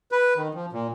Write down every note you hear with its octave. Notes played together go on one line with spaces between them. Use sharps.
B4
D#3
F3
A#2